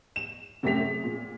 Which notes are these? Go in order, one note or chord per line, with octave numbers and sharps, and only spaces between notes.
E7
F#2 C3 A3 G4 B6 F7
G#4
A#2